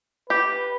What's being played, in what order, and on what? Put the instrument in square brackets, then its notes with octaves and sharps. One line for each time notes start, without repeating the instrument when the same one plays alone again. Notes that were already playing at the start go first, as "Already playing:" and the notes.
[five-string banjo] G4 [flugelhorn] B4